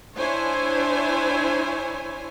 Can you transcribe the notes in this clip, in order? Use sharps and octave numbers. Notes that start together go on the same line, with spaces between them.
D4 E4 C5 C#5 G#5